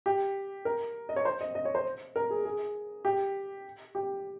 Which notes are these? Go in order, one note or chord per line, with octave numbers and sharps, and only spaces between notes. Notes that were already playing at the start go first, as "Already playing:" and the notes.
G4
A#4
D#5
C#5
C5
D#5
D#5
C#5
C5
A#4
G#4
G#4
G4
G4